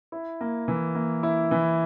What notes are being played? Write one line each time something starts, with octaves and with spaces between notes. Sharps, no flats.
E4
A#3
E3
A#3
E4
E3